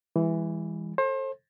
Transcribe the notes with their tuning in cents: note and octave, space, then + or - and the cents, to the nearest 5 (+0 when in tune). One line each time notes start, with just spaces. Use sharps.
E3 +0 G#3 -40
A4 +0 C5 +35